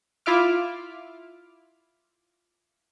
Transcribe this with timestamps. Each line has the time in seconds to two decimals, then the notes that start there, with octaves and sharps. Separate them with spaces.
0.26 E4 F4 E5 D6 F6